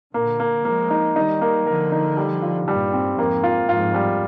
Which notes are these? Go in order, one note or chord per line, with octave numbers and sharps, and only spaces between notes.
A#2 D3 A#3
A#3
F3 G#3 A#3
D#4
D#3 G3 D#4
A#3
D3 F3 A#4
D#4
G3
F4
G2 A#2 G3
C4
F2 G#2 A#3
F4
F2 G#2 F4
G3